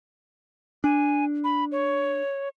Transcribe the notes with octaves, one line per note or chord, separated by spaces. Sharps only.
D4 G#5
B5
C#5